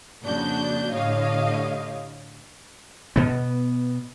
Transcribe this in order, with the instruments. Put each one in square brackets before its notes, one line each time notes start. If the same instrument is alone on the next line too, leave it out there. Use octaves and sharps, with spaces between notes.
[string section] F2 A#2 C#3 D4 F#4 G6
A2 D3 G4 C#5 D#5 F5
[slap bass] B2 B3